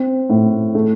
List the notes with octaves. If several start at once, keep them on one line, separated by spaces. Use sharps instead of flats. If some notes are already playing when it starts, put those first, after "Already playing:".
Already playing: C4
A2
A3